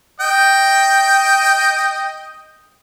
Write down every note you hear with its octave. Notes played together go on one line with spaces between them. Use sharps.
D#5 G5